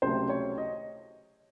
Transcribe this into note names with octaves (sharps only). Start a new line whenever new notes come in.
C#2 C3 F#3 A3 C5
C#5
D#5